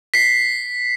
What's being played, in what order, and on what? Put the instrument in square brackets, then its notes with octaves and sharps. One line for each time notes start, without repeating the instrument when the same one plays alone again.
[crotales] B6 C7